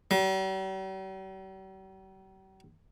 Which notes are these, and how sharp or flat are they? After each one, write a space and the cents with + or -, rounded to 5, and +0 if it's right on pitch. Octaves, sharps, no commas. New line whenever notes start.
G3 -45